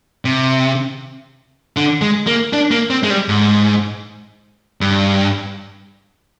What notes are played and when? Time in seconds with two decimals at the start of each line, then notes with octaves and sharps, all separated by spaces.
0.25 C3
1.77 D3
2.01 G#3
2.27 A#3
2.53 D4
2.71 A#3
2.90 C4
3.03 G#3
3.10 G3
3.29 G#2
4.81 G2